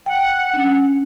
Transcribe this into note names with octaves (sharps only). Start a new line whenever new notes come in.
F#5 G5
C#4 D4